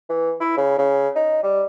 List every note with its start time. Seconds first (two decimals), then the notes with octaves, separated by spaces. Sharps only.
0.10 E3
0.41 E4
0.57 C#3
0.78 C#3
1.16 D#4
1.43 G3